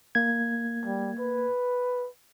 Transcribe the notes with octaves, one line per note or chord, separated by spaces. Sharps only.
A#3 G#6
G3
B4